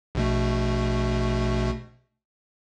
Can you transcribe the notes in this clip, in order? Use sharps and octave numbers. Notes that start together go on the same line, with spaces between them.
A#1 B2 A3